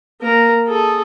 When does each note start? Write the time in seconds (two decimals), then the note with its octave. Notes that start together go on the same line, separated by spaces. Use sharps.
0.21 A#3 A#4
0.67 G#4 A4